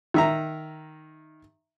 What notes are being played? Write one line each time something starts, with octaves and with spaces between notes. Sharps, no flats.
D#3 E5 A#5